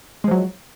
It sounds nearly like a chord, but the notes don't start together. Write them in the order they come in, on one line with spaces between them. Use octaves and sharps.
G#3 F3 F#3